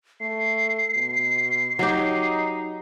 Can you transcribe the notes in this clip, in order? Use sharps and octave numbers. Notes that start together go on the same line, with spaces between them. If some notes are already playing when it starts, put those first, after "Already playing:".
A3 C7
B2
F#3 D#4 G4